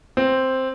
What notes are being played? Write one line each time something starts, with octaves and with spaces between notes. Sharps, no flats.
C4